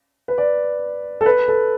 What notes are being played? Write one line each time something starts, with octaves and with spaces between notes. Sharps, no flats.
B4
D5
A4
B4
A4